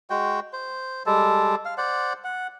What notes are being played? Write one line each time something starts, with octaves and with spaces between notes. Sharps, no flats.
G#3 F#4 G5
C5
G3 G#3 A4
F5
C5 D5 F#5
F#5